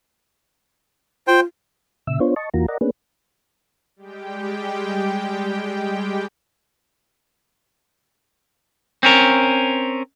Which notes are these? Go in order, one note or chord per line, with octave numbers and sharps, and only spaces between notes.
F4 C5 G5
A#2 C#3 E5 E6
B3 D4 F4 C5 C#5
D#5 A5 C#6
E2 E3 A#3 F4 F#4 A#5
A#4 D5 D#5 F#5 A#5
A#3 B3 C#4 D4 G#4 B4
G3 G#3 G4 G5
C4 C#4 A#4